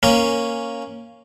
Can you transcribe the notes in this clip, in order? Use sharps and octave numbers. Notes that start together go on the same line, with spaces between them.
A#3 C#4